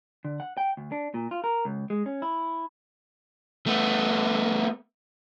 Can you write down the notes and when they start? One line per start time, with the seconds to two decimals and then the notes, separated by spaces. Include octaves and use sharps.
0.25 D3
0.40 F#5
0.57 G5
0.77 D2
0.92 D4
1.14 A#2
1.31 F4
1.44 A#4
1.65 C#2
1.90 G#3
2.06 C#4
2.22 E4
3.67 A3 B3